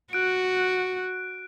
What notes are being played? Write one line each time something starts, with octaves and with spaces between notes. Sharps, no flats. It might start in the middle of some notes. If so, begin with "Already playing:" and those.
F#4 F#6 D7